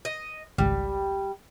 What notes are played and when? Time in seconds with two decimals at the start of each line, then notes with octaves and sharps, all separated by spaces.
0.05 D#5
0.58 G#1 C#2 G3